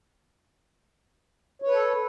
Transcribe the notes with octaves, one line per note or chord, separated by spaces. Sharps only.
A4 B4 C#5